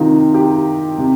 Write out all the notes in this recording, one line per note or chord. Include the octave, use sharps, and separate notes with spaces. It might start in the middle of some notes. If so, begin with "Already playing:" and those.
Already playing: C3 D#3 D#4 F4
G4
C3